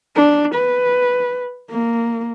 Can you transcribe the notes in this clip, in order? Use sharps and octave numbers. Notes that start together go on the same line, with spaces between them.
D4
B4
A#3